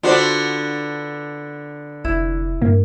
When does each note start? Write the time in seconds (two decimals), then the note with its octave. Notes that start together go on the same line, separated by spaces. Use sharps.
0.03 D3 B3 D4 F4 F#4 C5
2.05 F1 E4
2.62 G2 A#3